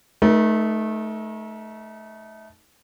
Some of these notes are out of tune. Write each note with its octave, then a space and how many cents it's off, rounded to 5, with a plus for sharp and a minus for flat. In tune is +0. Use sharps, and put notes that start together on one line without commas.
A3 -15 D#4 +0 A#4 +40